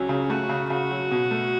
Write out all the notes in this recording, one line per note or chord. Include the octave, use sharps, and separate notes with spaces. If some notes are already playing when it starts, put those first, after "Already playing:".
Already playing: C#2 F#3 C#4
C#3
A3 F#4
C#3
C#3 F#4
F#3
B2
A3